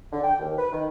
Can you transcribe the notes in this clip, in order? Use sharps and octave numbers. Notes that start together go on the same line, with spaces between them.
D3
G5
D#2
B4
D#3